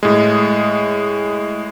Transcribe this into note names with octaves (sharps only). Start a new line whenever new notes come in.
A2 G#3